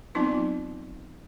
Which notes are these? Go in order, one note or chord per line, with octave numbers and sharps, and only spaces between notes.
F#3 B3 C4 D#4 F4